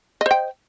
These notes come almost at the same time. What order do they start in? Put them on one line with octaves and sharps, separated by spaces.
D#5 C5 G5